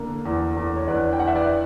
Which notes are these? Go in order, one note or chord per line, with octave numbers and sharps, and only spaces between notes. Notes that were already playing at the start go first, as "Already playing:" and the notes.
Already playing: D3 A#3
E2
E2
C#5
E2 B4 D5
G5
E2 F#5
E5
B4 D5